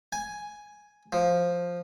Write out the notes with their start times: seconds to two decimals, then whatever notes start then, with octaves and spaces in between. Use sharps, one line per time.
0.12 G#5
1.13 F3